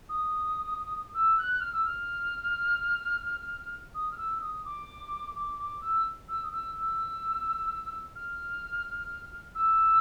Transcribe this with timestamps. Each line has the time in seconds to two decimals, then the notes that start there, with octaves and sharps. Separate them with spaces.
0.09 D#6
1.14 E6
1.38 F#6
1.60 F6
1.73 E6
1.85 F6
3.95 D#6
4.12 F6
4.18 E6
4.36 E6
4.41 D#6
4.65 D6
5.35 D6
5.59 D6
5.81 E6
6.28 E6
6.43 D#6
6.52 E6
6.75 E6
8.15 F6
9.55 E6